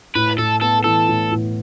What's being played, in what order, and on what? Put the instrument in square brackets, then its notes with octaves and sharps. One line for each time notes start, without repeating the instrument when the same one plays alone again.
[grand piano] A2 [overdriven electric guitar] B4
[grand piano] A2 [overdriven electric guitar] A4
[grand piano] B3 [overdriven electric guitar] A4
[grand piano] E3 [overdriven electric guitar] A4
[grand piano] A2
A2